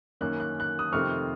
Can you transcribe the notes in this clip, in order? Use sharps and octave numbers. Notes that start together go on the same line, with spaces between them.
F#2 D#3 A#3 C#4 F#6
F#6
F#6
D#6 F#6
F2 C3 D#3 A3 C4 C#6 F6